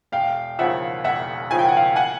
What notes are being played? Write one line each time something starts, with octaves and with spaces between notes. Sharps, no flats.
E1 F5 G5
D#2 C#3 F3 E5 F#5
E1 E5 F#5
D#2 C#3 F3 G#5
G5
F#5
F5 G5
F#5 G#5